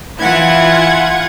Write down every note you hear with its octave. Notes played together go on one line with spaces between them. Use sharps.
E3 E4 F4 F#5 G#6